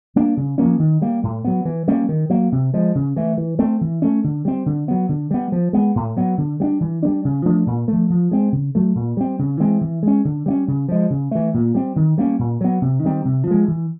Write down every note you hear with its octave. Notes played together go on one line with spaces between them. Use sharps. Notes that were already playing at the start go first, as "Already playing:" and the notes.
G3 A#3 D4
C#3
F3 A#3 C#4
D#3
G3 A#3
A2
F#3 B3
E3
G3 A#3 C#4
D#3
F#3 A#3
C3
F3 G#3
C#3
E3 A3
E3
A3 C4
E3
A3 C#4
D3
G3 C4
D3
F#3 B3
D3
G3 B3
F3
G#3 B3
A2
F#3 B3
D3
G3 B3 D4
E3
G3 A#3 D4
C#3
F3 A3 D4
A#2
F3 A3
F3
G#3 C4
C#3
F#3 A3
A#2
G3 C4
C#3
E3 G#3 C4
E3
G#3 C#4
D3
G3 A#3 C#4
C#3
F3 G#3
C#3
E3 A3
A#2
G3 C4
D#3
G3 A#3 C#4
A#2
F#3 B3
C3
D#3 G3 C4
C3
F3 G#3
E3